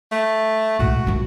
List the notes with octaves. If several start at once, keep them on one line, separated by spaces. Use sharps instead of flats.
A3
C#2 A2 F#4
F3 A#3